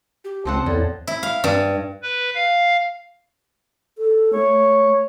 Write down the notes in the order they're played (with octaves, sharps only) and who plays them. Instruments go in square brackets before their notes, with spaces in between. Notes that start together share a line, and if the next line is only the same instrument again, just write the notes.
[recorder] G4
[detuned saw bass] C#2 [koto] F3 C4 F#5 [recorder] A5
[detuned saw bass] E2 [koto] A2 [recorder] D5
[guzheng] E4
F5
G2
[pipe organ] B4
F5
[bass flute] A4
[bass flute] A3 [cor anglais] C#5